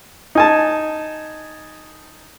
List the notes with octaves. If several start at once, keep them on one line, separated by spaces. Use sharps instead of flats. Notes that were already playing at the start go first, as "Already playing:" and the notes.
D#4 G#5 A5